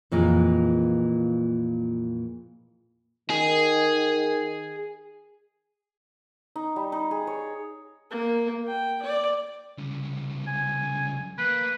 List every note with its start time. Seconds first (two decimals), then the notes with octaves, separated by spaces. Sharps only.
0.12 F2 A#2 E3 G#3
3.30 D#3 G#4
6.56 D#4
6.76 G3
6.92 D#4
7.11 G#4
7.27 C#5
8.11 A#3
8.67 G5
9.02 D5
9.78 C2 C#3
10.47 G#5
11.38 A#3 B4